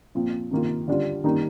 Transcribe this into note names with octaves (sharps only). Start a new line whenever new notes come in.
A#2 F3 C4
C3 D#3 A#3 F4
D3 G3 D4 F4
D#3 G3 A#3 D#4